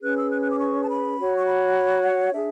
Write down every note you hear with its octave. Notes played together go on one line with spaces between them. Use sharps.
C#4 G#4 B4 F#6
E6
F#6
F#6
D6
C#6
A5
B5
F#4 C#5
C#6
B5
F#5
D4 G#4 E5